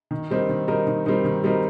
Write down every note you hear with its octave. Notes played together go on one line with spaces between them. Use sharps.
D#3
G3 C4 D#4 A#4
D#3
G3 C4 D#4 A#4
D#3
G3 C4 D#4 A#4
D#3
G3 C4 D#4 A#4